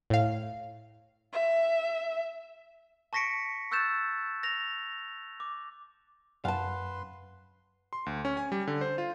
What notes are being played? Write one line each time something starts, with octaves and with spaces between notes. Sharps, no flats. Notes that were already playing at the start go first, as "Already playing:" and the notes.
A2 F5
E5
A5 C#6 A#6 B6 C#7 D7
C#6 E6 F#6 G6 A6 E7
A#6 F7
D6
F#2 B4 F5 F#5 A5 C6
C6
D2
C#4
G#5
G3
D3
C5
F4